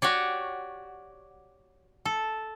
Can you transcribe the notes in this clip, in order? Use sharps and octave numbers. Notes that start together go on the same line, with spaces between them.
F#4 G4 C#5 D5
A4